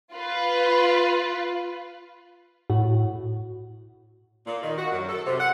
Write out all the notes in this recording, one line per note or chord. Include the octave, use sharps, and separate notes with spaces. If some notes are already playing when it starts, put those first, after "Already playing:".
F4 B4
A2 F#4
A#2
D#3
F#4
F#2
A4
C3
F#5